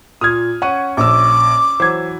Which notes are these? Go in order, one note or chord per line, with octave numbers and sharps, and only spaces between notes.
A#2 D#6 F6 G#6
C#4 F#5 C#6 D#7
A#1 D6 E6
E3 F#3 C5 G#6